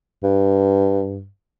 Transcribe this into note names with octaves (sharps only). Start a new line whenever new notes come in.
G2